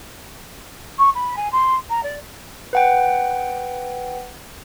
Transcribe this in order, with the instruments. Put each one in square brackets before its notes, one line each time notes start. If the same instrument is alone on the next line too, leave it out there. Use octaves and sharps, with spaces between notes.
[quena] C#6
B5
G#5
C6
A#5
D5
[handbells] B4 F#5 G5